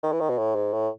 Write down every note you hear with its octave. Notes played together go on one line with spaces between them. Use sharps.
D#3
E3
D#3
B2
A2
G#2
A2